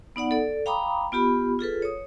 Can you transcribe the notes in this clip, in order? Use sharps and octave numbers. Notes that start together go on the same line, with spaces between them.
B3 D#4 D5 F#5
A4 D5
F5 G5 A#5 B5 D6 D#6
B3 F4 G4 B5
F4 G#4 A4 B4
C#5 D#6